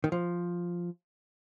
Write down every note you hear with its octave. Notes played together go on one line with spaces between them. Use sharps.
D#3
F3